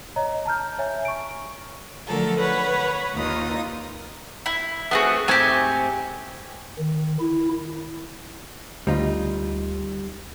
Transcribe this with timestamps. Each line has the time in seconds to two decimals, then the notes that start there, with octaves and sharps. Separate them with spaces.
0.16 C#5 D#5 A#5
0.46 A5 A#5 F6 G6
0.79 C#5 E5 G#5
1.05 C#6 D7
2.06 D3 F3 F#3 A3 A4 A#4
2.39 B4 C#5 F#5 B5
3.13 D#2 D#3 D#4 F4 D#6
4.46 E4
4.91 A3 B3 C4 F4 F#4 G#4
5.28 G#2 A3 C4 G4 G#5
6.79 D#3
7.20 E4
8.87 D2 G3 D#4 F4